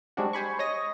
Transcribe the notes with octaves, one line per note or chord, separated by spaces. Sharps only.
G3 G#3 C4 D4 F#4
C5 G#5 B5 C#6
C#5 D#5 D#6 A#6